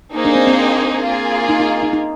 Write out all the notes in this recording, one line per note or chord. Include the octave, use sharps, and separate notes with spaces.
A#3 D#4 G#4 C5
D4
C4
C4
A#3 F4 G#4
D#4
D#4
D#4
D#4